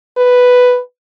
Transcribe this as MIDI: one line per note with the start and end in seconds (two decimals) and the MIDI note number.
0.17 0.80 71